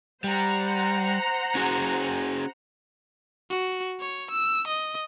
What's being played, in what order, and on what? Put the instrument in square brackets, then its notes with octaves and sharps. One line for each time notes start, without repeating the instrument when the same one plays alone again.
[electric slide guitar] G3 [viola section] C5 F#5 A#5
[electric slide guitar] C#4 F#4 G#4
[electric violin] F#4
C#5
E6
D#5